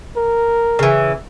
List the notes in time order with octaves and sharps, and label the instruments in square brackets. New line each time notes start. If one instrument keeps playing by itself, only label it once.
[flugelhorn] A#4
[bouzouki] C#3 E3